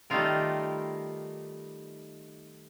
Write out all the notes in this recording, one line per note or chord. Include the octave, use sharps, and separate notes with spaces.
D#3 G3 A3 D#4 F4 A#4